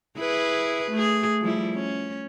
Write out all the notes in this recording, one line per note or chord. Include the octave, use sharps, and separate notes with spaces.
E4 G#4 B4
A3 G#4
F3 G3 E4
C#4